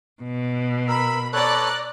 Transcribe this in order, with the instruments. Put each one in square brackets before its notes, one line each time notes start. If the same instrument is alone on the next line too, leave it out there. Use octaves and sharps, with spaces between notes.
[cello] B2
[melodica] A#4 E6 [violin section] B5
[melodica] A4 B4 C#5 [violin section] D5 A#5 F#6